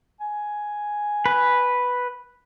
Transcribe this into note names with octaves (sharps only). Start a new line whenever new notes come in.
G#5
B4